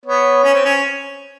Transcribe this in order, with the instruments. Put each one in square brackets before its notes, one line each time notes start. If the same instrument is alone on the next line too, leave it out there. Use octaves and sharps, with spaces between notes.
[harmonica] B3 [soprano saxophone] C#5
[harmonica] C#4
C4
C#4